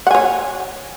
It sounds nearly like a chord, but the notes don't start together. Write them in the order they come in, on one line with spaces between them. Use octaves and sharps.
F#5 G#5 C#5